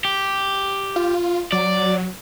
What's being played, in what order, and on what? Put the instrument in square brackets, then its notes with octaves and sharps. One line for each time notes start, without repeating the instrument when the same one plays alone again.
[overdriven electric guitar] G4
[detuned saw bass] F4
[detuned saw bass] F#3 [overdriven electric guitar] D5